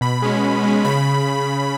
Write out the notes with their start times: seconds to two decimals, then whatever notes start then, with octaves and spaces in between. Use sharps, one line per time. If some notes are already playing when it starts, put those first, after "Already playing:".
0.01 B2 B5
0.22 G#3 C#4
0.43 B2
0.63 G#3 C#4
0.84 C#3 B5